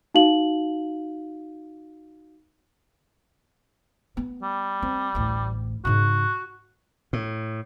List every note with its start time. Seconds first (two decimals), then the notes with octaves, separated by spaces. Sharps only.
0.15 D#4 F#4 F5 F#7
4.17 B3
4.42 G3
4.83 C4
5.15 A1 D2
5.85 G#2 C#3 F#4
7.13 A2